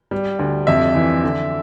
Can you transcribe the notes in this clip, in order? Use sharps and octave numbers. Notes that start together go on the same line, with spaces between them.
G3
D2
F2 E5
E3
D3